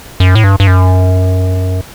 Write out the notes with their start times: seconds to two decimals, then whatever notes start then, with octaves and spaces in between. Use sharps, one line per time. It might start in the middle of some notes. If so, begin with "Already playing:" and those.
0.20 F#2
0.35 A2
0.44 G2
0.60 G2
0.67 F#2